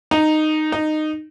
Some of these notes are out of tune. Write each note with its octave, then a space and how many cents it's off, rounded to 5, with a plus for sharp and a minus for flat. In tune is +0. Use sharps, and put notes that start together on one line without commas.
D#4 -10
D#4 -15